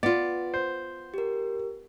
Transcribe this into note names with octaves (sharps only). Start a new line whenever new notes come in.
B3 F4 D5
C5
G4 A#4